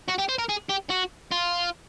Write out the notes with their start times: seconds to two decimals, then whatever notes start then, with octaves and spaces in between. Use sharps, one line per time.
0.08 F#4
0.18 G4
0.29 C5
0.38 A#4
0.49 G#4
0.69 G4
0.90 F#4
1.31 F4